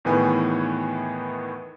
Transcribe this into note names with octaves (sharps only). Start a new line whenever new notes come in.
E2 A2 D#3 E3 B3 G#5